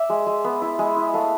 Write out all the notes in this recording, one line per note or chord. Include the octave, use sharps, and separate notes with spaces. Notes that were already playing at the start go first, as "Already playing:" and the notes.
Already playing: D5 E5
G#3
G#3
B3
E4
G#3
E4
A3 F5